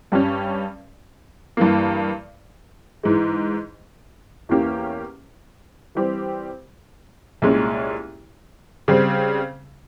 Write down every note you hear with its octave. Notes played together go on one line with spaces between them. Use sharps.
G2 G3 C#4
G2 E3 A#3
G#2 E3 G#3
E2 E3 A#3 C#4 G4
E3 G3 C4 G4
C2 A#2 G#3 C#4
C#3 G3 C4